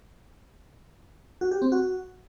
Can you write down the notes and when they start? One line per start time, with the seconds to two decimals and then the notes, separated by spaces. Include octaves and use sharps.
1.41 F#4
1.51 G4
1.62 C4
1.72 F#4